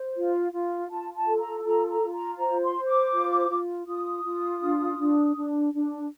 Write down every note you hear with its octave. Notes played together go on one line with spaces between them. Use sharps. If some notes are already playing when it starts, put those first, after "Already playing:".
Already playing: C5
F4
F4
F4 A5
A5
A4
A#5
F4 A#5
A#5
F4
A#5
C5 A#5
C6
C5
D6
F4
F4
F4 D#6
F4
D4
D4
D4
D4